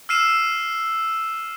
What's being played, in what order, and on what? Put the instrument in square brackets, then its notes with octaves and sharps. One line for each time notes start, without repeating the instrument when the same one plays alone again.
[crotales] E6 F6 C7 D#7 E7